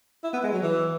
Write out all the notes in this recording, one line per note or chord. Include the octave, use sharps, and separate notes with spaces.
E4
B3
G#3
F#3
E3